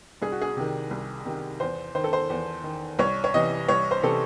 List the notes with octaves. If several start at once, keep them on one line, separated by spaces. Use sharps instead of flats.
C2 G#4
F#4
G#4
C3 D#3
C2
C3 D#3
E2 C5
D#3 C5
A4
C5
E2
D#3
C2 C#5
C#5
C3 E3 D#5
C2 C#5
C5
C3 E3 A4